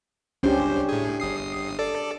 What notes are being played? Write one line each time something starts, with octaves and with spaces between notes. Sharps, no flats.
G1 C#2 C#4 D4 G4 C5
A2 G#4
G1 D#6 C7
A4 D5